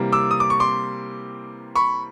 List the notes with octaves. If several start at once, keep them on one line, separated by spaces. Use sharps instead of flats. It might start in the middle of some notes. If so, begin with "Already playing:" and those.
Already playing: C3 E3 G3 A#3
D6 E6
D#6
D6
C#6
C6 D6
B5 C#6